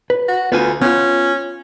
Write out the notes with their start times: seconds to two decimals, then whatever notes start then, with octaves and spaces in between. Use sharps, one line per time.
0.10 B4
0.28 F#4
0.52 D2 B3 F4 G#5
0.82 B3 C#4 F4